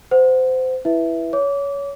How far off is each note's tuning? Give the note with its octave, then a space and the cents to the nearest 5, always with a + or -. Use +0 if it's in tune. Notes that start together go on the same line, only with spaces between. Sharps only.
C5 -25 F#5 +0
E4 +5 B4 -10 E5 +0
C#5 +20 D6 -25